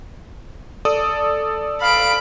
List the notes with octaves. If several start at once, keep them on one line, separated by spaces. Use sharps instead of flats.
A4 D5 D#6
F5 B5 D7